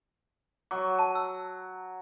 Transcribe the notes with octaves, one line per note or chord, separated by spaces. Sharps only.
F#3 C#6 D6
A5
E6